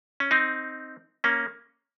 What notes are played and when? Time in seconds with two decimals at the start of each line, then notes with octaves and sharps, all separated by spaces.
0.20 C#4
0.31 C4 D#4
1.24 A#3 C#4